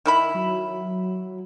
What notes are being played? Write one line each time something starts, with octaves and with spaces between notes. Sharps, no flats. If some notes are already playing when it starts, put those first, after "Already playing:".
D#3 E4 B5
F#3